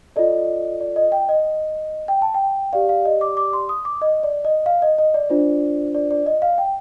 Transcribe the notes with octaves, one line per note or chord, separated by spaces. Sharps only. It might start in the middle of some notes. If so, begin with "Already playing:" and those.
F4 A4 D5 D#5
D5
D#5
G5
D#5
G5
A5
G5
G4 D5 F5
F5
D#5
D6
D6
C6
D#6
D6
D#5
D5
D#5
F5
D#5
D#5
D5
D4 F4 C5
D5
D5
D#5
F5
G5